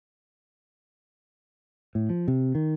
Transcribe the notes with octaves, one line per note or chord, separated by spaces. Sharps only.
A2
F3
C3
D#3